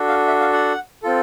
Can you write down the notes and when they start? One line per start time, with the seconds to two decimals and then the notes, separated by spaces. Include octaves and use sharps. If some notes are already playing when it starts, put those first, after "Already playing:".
Already playing: D4 F#4 A4
0.08 F5
0.28 E5
0.41 F5
0.53 F#5
1.03 C4 F4 A4